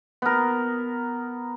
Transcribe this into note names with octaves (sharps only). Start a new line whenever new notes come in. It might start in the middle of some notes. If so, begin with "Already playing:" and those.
B3 A#4